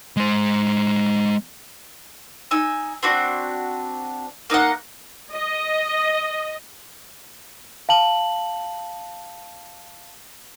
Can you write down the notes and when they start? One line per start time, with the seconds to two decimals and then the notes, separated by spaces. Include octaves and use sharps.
0.17 G#3 C5
2.51 D#4 G#5 E6
3.03 C4 D4 F#4 D5
4.50 A#3 D#4 D#5 F#5
5.34 D#5
7.89 F5 A5 F#7